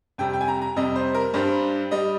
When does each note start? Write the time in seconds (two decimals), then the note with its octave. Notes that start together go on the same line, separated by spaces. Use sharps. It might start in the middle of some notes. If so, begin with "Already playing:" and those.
0.18 F2 C3 G3 G5
0.33 G5
0.41 G#5
0.48 A#5
0.62 A#5
0.76 F2 C3 G3 D#5
0.96 C5
1.14 A#4
1.34 G2 G3 C5
1.91 G3 D#5